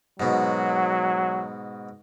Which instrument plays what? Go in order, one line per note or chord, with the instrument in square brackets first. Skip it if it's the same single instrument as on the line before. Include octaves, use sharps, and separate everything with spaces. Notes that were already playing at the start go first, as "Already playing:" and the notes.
[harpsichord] G#2 B2 [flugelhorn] F#3